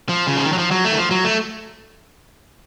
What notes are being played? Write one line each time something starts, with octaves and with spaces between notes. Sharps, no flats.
F3
C#3
F3
D#3
F#3
F3
F#3
A3
D#3
F3
F#3
A3